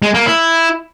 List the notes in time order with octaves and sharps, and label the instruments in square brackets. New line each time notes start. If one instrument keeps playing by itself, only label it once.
[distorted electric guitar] G#3
A#3
E4